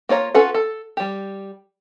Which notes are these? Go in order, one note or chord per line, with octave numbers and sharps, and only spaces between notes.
A#3 F4 C#5 A#5
C#4 F4 A4 B4 F#5
A4
G3 G4